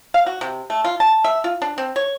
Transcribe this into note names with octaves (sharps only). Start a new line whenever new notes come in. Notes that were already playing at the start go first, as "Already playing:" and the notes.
F5
F#4
C3
A3
F4
A5
E5
F4
D4
C4
C#5